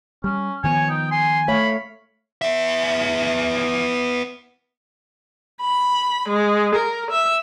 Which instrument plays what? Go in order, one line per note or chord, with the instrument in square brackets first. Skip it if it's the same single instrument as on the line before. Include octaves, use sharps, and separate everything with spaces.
[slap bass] G3 [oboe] C#4
[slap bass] D#3 F3 B3 [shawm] C#5 [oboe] G#5
[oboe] D#4 [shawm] G5
[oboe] G#5 [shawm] C6
[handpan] A3 C#5 F5 [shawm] B5
[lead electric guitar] B3 E5
[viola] B5
G#3
A#4
E5